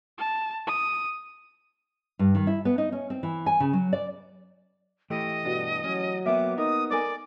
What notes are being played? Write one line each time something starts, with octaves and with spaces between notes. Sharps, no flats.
A5
D#6
G2
D#3
E4
B3
D#4
C#4
C4
E3
G#5
C#3
F#3
D5
E3 A3 G4 D#5
G2 B2 D4 F#4
F#3 C#4
A#3 B3 F#4 E5 G5 D6
D#4 A#4 D#6
A4 A#4 D5 G#5